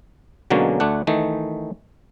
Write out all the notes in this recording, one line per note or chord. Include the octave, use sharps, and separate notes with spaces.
B2 D3 F#3 G#3 A#3 C#4
D2 A3 D4 F#5
D#3 E3 A3 D#4